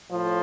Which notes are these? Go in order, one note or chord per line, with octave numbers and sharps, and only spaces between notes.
A2 F3